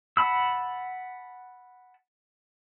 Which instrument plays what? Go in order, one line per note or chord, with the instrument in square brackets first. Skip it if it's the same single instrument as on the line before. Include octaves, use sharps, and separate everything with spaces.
[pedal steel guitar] F#5 A5 B5 E6